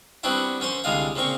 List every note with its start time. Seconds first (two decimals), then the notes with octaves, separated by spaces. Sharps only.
0.23 G3 B3 C4 D4 E4 F#4
0.60 F#2 C#4 C5 C6
0.84 C2 D3 G#3 F4 F5 A#5
1.16 A#2 C#3 A#3 C4 C#6